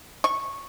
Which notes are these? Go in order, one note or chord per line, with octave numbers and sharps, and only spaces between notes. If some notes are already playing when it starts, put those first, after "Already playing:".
C#6